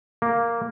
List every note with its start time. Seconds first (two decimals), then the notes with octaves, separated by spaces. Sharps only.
0.22 A#3